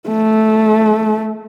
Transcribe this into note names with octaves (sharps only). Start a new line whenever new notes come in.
A3